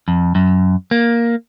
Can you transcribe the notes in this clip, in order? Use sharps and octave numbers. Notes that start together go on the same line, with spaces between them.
F2
F#2
A#3